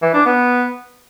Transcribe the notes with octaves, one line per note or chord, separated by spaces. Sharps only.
E3
D4
B3